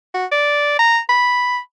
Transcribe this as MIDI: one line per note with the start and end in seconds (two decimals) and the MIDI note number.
0.14 0.26 66
0.32 0.76 74
0.79 0.99 82
1.09 1.58 83